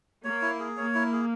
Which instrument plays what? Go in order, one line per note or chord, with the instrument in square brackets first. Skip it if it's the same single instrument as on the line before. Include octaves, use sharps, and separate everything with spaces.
[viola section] A#3 [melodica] C#5
[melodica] E4
G#4
[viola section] A#3 [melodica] C#5
[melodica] E4
G#4